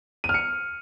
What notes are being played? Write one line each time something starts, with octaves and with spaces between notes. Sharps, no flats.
D#7
F6
C#7